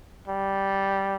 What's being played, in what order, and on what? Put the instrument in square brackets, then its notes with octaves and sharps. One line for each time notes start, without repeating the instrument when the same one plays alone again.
[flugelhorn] G3